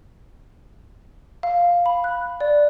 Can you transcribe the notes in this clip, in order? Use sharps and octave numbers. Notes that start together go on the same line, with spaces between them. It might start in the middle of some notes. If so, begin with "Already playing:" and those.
F5
B5
F#6
D5